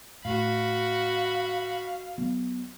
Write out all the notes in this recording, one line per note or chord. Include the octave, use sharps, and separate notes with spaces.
A2 F#4 F5 B5
F#3 B3